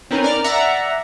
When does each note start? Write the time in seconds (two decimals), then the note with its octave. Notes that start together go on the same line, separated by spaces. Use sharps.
0.11 C4 C#4 D#4 A#4 B4
0.23 A#4 D5 F6
0.44 D5 E5 F#5 A#5